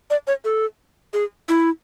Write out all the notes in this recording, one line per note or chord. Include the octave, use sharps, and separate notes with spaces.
D5
C#5
A4
G#4
E4